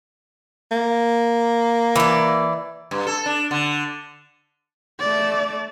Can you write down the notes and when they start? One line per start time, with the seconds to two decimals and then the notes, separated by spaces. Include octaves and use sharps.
0.71 A#3
1.96 E3 D5
2.91 G2
3.07 A4
3.26 D4
3.51 D3
5.00 A3 D5